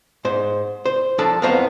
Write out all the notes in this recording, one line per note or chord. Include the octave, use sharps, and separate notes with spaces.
G#2 C5
C5
F#2 F3 D4 A4 A5
F2 A2 F#3 B3 C5 F5